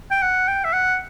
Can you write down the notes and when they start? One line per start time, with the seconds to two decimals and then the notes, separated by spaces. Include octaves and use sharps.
0.11 G5
0.22 F#5
0.48 G5
0.65 E5
0.73 F#5